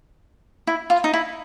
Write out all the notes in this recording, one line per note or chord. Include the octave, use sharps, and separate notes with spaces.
E4
F4
D#4
E4